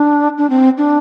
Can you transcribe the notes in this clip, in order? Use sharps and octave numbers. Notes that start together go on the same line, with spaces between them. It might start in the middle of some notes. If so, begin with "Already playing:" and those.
Already playing: D4
D4
C4
D4